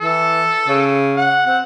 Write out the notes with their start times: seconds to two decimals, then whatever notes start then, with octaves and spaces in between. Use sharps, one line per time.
0.01 E3 A4
0.68 C#3
1.17 F#5
1.46 C4 F#5